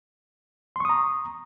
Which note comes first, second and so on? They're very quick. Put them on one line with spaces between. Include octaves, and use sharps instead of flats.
C6 C#6 D#6 A#5